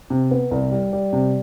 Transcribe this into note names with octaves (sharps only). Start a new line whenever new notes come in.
C3
B3
C2
G3
G3
C3